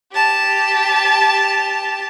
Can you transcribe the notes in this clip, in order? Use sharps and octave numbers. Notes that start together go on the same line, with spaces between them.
G4 A5